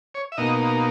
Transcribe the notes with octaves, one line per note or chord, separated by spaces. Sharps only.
C#5
E5
B2 A#3 D#4 D#5